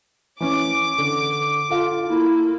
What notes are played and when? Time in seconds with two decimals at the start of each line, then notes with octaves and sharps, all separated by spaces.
0.40 E3 C#4 D6
0.98 D3
1.70 F4 A4 F5
2.08 A#3 E4